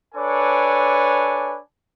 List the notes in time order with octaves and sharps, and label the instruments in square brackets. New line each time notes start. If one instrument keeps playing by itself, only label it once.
[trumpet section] D4 A4 B4 C#5 G#5 D6